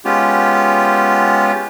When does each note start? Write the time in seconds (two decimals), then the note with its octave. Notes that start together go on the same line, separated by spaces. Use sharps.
0.05 G#3 B3 C#4 F4 G4